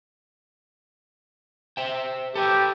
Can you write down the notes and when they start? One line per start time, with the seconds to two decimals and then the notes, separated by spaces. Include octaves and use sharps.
1.77 C5 E5 G5
2.35 G4 A4 B4 E5